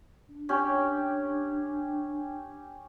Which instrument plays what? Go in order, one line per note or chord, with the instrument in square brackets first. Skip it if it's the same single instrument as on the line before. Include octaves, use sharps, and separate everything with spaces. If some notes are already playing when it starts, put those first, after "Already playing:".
[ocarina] D4
[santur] C#4 G4